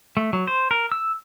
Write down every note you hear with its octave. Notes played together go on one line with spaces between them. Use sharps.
A3
F#3
C5
A#4
E6